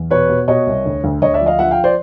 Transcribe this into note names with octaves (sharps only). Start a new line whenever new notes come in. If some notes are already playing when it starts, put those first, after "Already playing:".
Already playing: E2
B2 B4 C#5
B2
B2 C#5 D#5
C2
D2
D2
D2 C#5 D#5
D5 E5
F3
D#5 F5
F3 E5 F#5
F5 G5
C5 D5